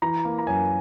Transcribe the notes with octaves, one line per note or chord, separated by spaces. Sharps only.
E3 A#5
A#3
A#5
F#2 G#5